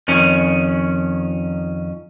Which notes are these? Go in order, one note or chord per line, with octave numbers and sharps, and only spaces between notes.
F2 D#3 C#4